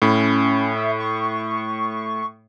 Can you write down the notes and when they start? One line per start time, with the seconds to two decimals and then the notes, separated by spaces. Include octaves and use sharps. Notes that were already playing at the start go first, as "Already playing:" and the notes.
0.02 A2 C#4 B5
0.76 E5
1.00 C#6